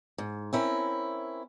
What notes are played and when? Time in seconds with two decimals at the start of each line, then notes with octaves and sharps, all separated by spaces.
0.18 G#2
0.53 C4 C#4 E4 A#4